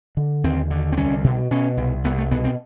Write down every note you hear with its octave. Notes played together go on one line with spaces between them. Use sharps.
D3
D#2 C4
D3
C4
C2 C#4
B2
B2 C#4
C2
C2 B3
A3
B2 B3
C4